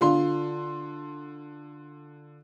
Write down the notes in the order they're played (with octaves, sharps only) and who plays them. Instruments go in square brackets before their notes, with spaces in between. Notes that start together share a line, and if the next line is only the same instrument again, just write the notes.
[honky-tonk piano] D3 F4 C6